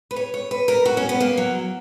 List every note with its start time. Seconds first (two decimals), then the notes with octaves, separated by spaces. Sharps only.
0.11 B4
0.16 C#5
0.34 C#5
0.51 B4
0.68 A#4
0.86 F#4
0.97 C#4
1.09 B3
1.20 A#3
1.37 F#3